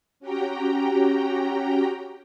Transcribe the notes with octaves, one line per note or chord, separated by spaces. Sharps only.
C#4 F#4 G4 G5 A#5